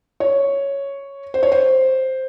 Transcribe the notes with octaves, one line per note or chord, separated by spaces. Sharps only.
C#5
C5
C#5
C5